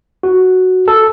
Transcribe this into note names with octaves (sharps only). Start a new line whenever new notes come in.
F#4
A4